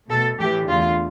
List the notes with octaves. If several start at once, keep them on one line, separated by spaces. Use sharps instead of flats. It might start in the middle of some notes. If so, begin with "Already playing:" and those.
B2 A3 A4
A2 E3 A3 G4
E2 D3 A3 F4